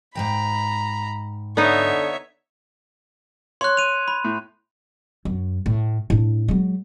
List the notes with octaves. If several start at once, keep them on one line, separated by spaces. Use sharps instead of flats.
G#2 E3 G5 A#5 B5
D3 B3 D#4 C#5 E5
C#5 C6 F#6
D#7 F7
B5
A2
F#2
A2
A2 D4
F#3 G#3